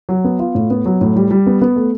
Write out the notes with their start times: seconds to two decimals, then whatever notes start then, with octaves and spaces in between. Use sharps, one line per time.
0.09 F#3
0.24 B3
0.39 F4
0.55 A2
0.70 B3
0.86 F#3
1.01 A2
1.16 G3
1.31 G3
1.46 B3
1.61 B3
1.76 A3